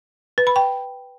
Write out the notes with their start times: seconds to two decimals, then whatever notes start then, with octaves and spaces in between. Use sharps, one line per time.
0.38 B4
0.47 B5
0.56 G5